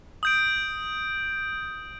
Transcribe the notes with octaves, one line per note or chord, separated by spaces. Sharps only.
D#6 G6 D7